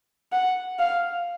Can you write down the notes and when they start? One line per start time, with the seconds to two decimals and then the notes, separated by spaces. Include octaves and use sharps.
0.32 F#5
0.79 F5